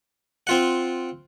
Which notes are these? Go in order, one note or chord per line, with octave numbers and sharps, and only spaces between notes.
C4 F4 F#5